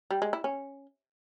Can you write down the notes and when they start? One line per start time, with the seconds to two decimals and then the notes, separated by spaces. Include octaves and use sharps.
0.11 G3
0.22 G#3
0.33 E4
0.44 C#4